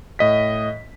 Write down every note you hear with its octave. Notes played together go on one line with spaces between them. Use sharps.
A2 D#5 B6